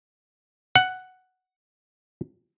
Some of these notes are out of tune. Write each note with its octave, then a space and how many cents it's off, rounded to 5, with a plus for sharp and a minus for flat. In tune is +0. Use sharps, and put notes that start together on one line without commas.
F#5 +5